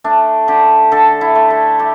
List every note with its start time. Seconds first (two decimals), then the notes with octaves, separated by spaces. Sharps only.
0.04 A3 D4
0.48 D3 G4
0.92 D3 A4
1.21 E4
1.35 A3
1.50 A4
1.79 A3 G4